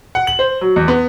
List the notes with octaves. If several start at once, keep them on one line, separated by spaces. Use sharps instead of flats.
F#5
F#7
C5
F#3
E2
B3